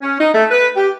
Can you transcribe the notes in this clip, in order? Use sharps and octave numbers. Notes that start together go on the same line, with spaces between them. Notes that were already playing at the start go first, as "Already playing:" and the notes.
C#4
D#4
A3
B4
G4